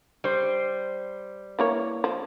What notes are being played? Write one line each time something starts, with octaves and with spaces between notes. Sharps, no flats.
G3 C5
E3 A#3 C#5
F3